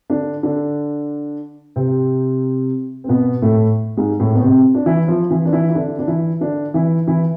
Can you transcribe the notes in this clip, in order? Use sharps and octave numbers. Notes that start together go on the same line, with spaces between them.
D3 D4
D3 D4
C3 C4
C4
B2 B3
A2 A3
G#2 G#3
A2 A3
B3
C3 C4
D4
E3 E4
F3 F4
E3 E4
D4
E3 E4
E4
D3 D4
D4
E3 E4
D3 D4
E3 E4
E3 E4